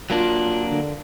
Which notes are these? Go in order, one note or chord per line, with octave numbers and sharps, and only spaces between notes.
F#3 A#3 D4 F4
D3